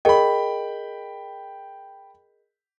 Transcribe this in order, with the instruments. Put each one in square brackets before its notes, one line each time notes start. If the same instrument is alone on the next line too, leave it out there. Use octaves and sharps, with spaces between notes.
[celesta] G#4 A#4 D#5 [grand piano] G5 B5